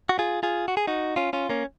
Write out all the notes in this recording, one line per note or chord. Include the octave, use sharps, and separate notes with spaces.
F#4
F4 G#4
F4 G#4
F#4
G#4
D#4 F#4
C#4 F4
C#4 F4
A#3 C#4